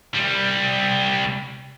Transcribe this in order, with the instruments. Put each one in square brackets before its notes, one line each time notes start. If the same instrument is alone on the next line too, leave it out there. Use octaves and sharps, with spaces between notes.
[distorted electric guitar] C2 G3